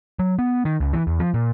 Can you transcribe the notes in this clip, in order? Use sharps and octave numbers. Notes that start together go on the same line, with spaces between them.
F#3
B3
D#3
C#2
E3
E2
F3
A#2